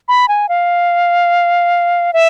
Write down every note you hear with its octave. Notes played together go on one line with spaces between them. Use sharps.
B5
G#5
F5
E5